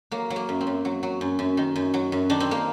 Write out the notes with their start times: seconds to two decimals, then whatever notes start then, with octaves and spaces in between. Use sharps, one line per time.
0.11 F#3 A#3
0.30 F#3
0.36 A#3
0.49 F#2
0.61 C4
0.67 F#2
0.85 F#3
1.03 F#3
1.21 F#2
1.39 F#2
1.57 D#3
1.76 F#2
1.94 F#3
2.12 F#2
2.30 D#3 D4
2.40 C4
2.51 A#3